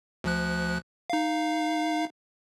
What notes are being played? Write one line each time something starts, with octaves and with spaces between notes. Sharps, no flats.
D2 F3 F#6
D#4 F5